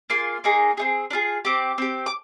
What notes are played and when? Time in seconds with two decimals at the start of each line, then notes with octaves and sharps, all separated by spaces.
0.10 A#3 F4 G#4 C6
0.44 A#3 D#4 G#4
0.77 C4 D#4 G#4
1.11 D4
1.13 F4 G#4
1.45 C4 G4 D6
1.78 C4 G4
2.06 D6